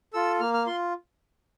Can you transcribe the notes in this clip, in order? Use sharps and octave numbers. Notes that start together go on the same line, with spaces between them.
F4 A4 E6
A#3 F6
F6
F4 C6